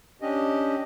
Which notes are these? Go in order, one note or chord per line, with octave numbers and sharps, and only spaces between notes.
C#4 D4 G4 D#5